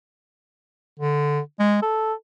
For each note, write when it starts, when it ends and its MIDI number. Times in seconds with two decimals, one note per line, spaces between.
0.99 1.40 50
1.59 1.78 56
1.82 2.13 69